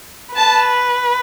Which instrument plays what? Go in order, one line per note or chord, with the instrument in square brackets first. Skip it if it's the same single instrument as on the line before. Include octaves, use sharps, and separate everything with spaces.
[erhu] B4 [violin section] A5